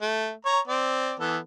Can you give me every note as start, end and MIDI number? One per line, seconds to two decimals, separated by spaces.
0.02 0.31 57
0.45 0.60 73
0.45 0.60 82
0.67 1.14 60
0.67 1.14 74
1.19 1.38 52
1.19 1.38 59
1.19 1.38 69